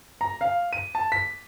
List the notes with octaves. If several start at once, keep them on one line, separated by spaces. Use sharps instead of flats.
A#5
F5
D#7
A5
B6